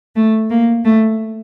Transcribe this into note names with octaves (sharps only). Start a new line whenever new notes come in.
A3
A#3
A3